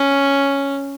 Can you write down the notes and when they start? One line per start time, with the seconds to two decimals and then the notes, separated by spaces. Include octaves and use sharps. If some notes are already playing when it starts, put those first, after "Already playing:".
Already playing: C#4